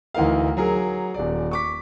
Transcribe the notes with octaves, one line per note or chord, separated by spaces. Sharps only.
D2 E3 D#4 A#4 F5
F#3 G#4 A#4
D#1 D5
C#6 D6 B6